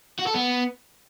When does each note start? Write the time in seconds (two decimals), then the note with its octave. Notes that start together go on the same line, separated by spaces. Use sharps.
0.19 F#4
0.26 A4
0.34 B3